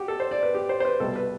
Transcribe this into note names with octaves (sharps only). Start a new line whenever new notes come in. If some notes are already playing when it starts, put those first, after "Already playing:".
Already playing: F#4 G4
A4
C5
D5
B4
G4
C5
C5
B4
C2 B2 G3 A4
B4